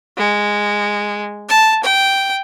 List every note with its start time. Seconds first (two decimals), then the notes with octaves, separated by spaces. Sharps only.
0.18 G#3
1.49 A5
1.83 G5